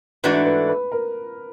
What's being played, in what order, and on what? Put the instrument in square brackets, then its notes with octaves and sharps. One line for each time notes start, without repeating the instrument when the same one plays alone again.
[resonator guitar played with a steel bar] G#2 E3 A3 D4 F#4 [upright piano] B4
[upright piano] B4
B4
A#4